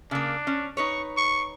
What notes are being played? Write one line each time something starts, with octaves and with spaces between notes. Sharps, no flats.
C#3 A#3 D4
C#4
D#4 B4 C#5 C#6
C#6